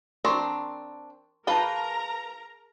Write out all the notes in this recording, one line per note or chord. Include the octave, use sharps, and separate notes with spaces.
C4 D4 A#4 A#5 C6 C#6
F4 G#4 A#4 B4 G5 A5 A#5